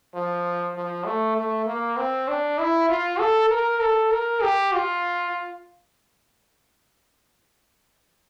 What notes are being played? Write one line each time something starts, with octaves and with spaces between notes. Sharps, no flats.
F3
F3
A3
A3
A#3
C4
D4
E4
F4
A4
A#4
A4
A#4
G4
F4